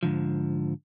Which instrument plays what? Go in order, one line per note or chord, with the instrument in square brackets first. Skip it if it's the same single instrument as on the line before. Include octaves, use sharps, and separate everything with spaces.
[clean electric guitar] G#2 D3 F3